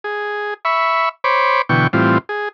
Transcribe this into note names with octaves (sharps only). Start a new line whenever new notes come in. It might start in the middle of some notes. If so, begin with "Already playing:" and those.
G#4
E5 B5 C#6
C5 C#5 B5 D6
B2 D3 E3 G5 C#6
A2 E3 G3 C4 F4
G#4